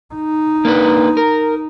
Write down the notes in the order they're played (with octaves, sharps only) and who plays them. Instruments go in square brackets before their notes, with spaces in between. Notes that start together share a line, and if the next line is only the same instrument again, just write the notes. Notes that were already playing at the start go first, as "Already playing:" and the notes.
[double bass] D#4
[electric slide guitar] A#3 D4 B4
A#4